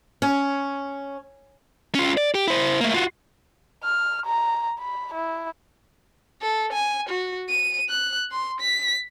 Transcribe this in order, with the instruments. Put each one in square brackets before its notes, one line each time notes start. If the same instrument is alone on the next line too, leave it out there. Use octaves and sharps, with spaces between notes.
[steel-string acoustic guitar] C#4
[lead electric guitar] C#4 F4
D5
G4
E4 C5
A3 A#3
F4 F#4
[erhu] F6
A#5
B5
E4
[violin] A4
G#5
F#4
D#7
F#6
C6
B6